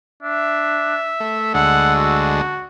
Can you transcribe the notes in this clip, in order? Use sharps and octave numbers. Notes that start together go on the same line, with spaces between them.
D4 E5
A3
D2 G#3 D4 F#5 E6
F#4